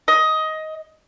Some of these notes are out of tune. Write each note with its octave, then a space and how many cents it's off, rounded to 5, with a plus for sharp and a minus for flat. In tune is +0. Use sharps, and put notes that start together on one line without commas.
D#5 +15